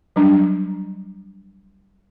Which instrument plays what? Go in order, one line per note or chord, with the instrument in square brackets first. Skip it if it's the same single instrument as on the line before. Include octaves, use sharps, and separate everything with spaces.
[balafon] F#3 G3 D4